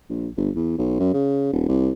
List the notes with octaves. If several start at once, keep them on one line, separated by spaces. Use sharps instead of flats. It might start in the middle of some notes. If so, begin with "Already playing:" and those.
A#1
G1
E2
B1
F#2
C#3
D#1
C2